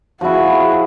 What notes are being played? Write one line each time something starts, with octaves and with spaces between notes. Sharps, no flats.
F3 E4 F#4 G#4